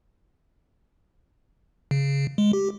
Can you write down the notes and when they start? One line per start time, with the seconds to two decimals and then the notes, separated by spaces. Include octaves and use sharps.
1.91 C#3
2.38 G#3
2.53 G4